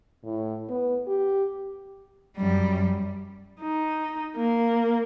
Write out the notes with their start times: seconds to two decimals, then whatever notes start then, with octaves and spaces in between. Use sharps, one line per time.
0.24 A2
0.69 B3
1.07 G4
2.37 F#2 G3
3.61 D#4
4.37 A#3